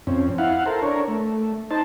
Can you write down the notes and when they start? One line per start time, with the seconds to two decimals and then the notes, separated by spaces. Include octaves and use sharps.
0.07 F2 C4 C#4
0.38 E4 F5 F#5
0.66 A4 A#4 C5
0.82 D4 A#4 C#5
1.08 A3
1.71 D#4 C5 A5